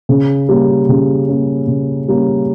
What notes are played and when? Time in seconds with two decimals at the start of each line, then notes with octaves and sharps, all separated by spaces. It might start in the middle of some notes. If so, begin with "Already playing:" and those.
0.09 C#3
0.49 G3 A#3 C#4
0.89 C#3
1.28 G3 A#3 C#4
1.68 C#3
2.08 G3 A#3 C#4